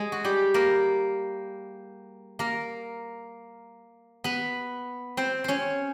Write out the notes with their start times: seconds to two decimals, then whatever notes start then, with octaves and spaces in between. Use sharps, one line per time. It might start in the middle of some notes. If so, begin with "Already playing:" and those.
Already playing: G#3 G#4
0.12 F#4
0.24 G3 G4
0.54 A#3 A#4
2.39 A#3 A#4
4.24 B3 B4
5.17 C4 C5
5.44 C#4 C5 C#5